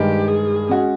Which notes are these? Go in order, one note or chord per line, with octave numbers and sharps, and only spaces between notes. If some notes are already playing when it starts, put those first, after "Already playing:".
Already playing: G2 D#3 G#3 G4
G#4
G#3 C#4 F#4